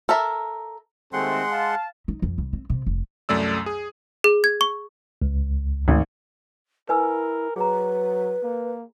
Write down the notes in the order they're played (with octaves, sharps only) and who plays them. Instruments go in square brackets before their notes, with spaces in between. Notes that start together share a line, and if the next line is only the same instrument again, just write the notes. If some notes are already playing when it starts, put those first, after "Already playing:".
[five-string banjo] A4 A#4 E5
[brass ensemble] D#2 A3 C4 [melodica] G#3 F#5 C6
[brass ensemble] F5 A5
[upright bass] D#4
F2
C2
C4
C3
F1
[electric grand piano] C2 F#2 A3 D5 E6
G#4
[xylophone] G#4
G#6
C#6
[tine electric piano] C#2
[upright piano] G#1 [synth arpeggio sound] D2
[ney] E4 [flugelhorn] A#4 [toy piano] B4 G#5 E6
[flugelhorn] F#3 [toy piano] G#4 A#5 [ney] B4
[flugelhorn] A#3